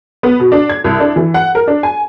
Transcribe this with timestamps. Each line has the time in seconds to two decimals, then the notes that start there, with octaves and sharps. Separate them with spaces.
0.23 B3
0.40 B2
0.52 D4
0.69 G#6
0.84 C2
1.00 D4
1.16 E3
1.34 F#5
1.55 A#4
1.67 D4
1.83 G#5